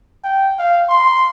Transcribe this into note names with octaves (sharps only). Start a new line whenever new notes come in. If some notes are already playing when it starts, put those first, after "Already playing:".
G5
F5
C6